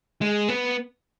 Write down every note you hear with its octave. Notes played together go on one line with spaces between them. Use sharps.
G#3
B3